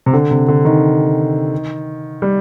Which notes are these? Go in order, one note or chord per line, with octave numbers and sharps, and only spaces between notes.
C3
D3
C3
D3
D#3
G3